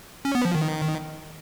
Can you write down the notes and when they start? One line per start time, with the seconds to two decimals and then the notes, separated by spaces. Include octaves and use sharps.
0.25 C#4
0.35 B3
0.45 F3
0.55 D#3